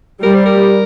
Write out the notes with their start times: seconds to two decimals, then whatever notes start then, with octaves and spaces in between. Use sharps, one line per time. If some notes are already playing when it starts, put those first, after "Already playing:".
0.23 G3 A#4
0.35 C5
0.46 A#4